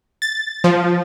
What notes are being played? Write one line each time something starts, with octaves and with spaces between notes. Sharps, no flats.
A6
F3